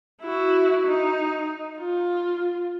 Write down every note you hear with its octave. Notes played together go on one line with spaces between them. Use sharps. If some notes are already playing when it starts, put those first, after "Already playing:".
E4 F#4
D#4
F4